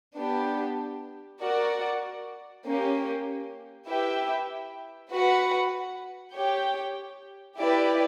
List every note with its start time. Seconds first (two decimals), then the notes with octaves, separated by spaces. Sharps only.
0.18 B3 D4 G4
1.42 F#4 A#4 D5 F#5
2.65 A#3 C#4 G4
3.89 E4 G4 B4 E5 G5
5.12 F#4 B4 F#5
6.36 G4 C#5 G5
7.59 E4 G4 B4 D5